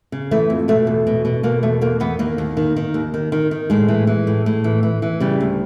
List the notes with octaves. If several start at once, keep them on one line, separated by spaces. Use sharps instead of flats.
C#3
E3 A3
F2
B2 A3
E2
B2
B2
B2 A#3
E2 A3
E2 A#3
E2 B3
D#2 A#3
D#2
D#3
D#3
D#2
D#3
D#3
D#3
A2 G#3
E3
E3
A2
A2
E3
E3
E3
C#3 G3
D2